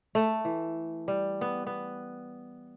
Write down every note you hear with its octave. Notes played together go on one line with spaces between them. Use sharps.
A3
E3
G3
B3
B3